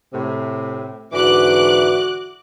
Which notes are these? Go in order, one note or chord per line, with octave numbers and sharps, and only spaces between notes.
A2 C3
G#2 D3 E3 F#4 D6 F#6